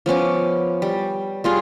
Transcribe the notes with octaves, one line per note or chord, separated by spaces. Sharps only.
F3 B3 C#4 D6
G3
G3 F4 G#4